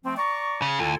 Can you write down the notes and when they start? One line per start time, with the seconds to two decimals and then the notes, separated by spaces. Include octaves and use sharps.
0.04 F3 A3 C4
0.16 D5 A#5 C#6
0.62 C#3
0.79 D2 E4 F4 A4